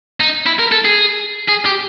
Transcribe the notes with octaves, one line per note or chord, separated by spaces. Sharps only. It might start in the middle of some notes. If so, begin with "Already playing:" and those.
D#4
E4
A#4
A4
G#4
G#4
G4